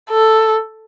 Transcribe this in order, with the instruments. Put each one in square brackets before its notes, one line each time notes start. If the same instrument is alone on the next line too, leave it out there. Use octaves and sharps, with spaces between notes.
[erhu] A4